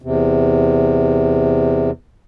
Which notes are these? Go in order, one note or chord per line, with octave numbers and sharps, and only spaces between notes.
E2 C3